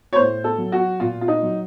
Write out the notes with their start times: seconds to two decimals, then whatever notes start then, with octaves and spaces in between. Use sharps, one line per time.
0.13 C#5
0.16 A2 C5
0.44 A4
0.58 F#3
0.72 F#4
1.00 A#2 F4
1.21 F4
1.28 D#4
1.43 F#3